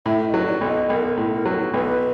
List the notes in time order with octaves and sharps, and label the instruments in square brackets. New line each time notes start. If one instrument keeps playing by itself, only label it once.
[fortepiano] A2 [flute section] E5
[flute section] D#5
[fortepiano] F#3
[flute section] D5
[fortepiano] B1
[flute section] D#5
[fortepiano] B1 [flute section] A#4
[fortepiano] A2
[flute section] A#4
[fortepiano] F#3
[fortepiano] B1 [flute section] B4